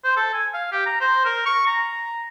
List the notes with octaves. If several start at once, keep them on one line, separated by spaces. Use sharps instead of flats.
C5
A4
G#5
F5
G4
A#5
C5
A#4
C#6
A#5